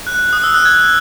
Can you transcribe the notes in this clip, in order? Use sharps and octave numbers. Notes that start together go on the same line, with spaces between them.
F#6
D#6
E6
F#6
G#6